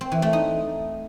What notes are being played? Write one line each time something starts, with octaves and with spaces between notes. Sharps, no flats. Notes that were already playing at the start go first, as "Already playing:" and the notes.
C4
E3
A3
D#4